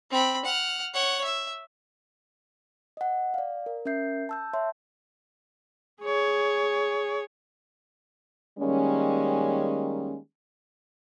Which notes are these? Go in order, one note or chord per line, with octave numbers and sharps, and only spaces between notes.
C4 B5
F#5 F6
C#5 F#5
E5
D#5 F#5
D5 F5
A#4
C#4 A#4 E5 G6 C7
A5 E6 G6
C#5 E5 A5 C6
G#4 C#5
D#3 G3 G#3 A#3 C#4